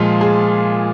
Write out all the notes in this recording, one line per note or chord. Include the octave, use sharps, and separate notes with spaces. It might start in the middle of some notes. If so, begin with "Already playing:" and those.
Already playing: A#2 F3 G#3 F4
G#4